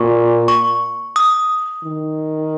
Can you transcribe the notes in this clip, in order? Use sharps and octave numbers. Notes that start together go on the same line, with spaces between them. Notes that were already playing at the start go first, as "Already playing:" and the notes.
Already playing: A#2 C#6
C#6
D#6
D#3